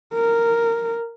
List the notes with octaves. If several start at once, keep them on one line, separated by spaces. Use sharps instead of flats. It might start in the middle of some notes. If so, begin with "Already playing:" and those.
A#4